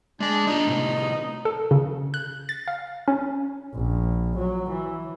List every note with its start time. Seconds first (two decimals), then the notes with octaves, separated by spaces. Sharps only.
0.20 G#3 D4 G#5
0.47 D4 D#4 F4
0.67 A2 C3
1.45 A4
1.71 C#3
2.14 F#6
2.49 A6
2.68 F5
3.08 C#4
3.74 A#1
4.37 F#3
4.70 E3